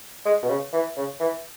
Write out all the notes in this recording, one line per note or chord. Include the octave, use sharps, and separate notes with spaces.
G#3
B2
C#3
E3
C#3
E3